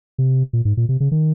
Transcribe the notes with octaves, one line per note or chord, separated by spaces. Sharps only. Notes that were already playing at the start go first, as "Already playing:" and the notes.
C3
A#2
G#2
A#2
C3
C#3
D#3